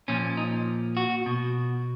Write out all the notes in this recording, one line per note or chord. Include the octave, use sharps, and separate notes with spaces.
A#2 F3 C#4
D#4
F#4
B2